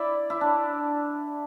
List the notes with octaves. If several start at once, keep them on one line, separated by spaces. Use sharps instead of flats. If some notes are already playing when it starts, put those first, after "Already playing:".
Already playing: E4 D5
E4
D4